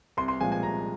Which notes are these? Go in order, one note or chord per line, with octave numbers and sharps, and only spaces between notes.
C2 C6
C6
A#2 F3 G#3 G#5
G#5
C2 A#5